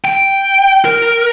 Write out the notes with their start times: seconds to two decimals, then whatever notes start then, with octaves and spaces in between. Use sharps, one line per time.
0.05 G5
0.85 A#4